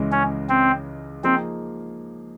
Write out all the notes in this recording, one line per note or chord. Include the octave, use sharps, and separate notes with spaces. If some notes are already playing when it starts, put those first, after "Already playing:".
Already playing: C#2 C#3 E3 G#3
C#4
C4
F3 A#3 C4 D#4 G#4